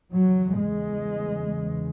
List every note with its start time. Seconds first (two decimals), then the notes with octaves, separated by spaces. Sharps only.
0.12 E2 C#3 F#3
0.55 G#3